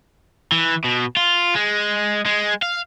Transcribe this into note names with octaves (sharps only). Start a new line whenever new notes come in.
E3
B2
F4
G#3
G#3
F5